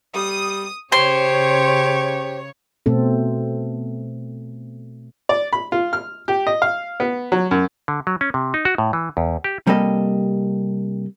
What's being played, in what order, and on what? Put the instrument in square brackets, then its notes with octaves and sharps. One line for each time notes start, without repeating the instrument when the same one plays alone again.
[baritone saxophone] G3 [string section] D#6
[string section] C#3 C#5 [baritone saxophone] G4 [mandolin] C5
[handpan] B2 A3 C4 A4
[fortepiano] D5
B5
F4
F6
G4
D#5
F5
B3
F#3
F#2
[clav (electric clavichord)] D3
F#3
C#4
C3
D#4
F#4
A2
E3
E2
G4
[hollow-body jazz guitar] C3 G3 A#3 A4 D#5